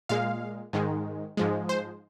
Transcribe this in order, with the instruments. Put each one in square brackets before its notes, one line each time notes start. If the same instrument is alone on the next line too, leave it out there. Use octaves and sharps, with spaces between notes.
[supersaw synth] A#2 G#3 F5
G#2 D#3 G#3
G#2 F3 G#3
C5